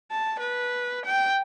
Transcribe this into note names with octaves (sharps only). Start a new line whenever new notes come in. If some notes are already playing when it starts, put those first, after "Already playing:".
A5
B4
G5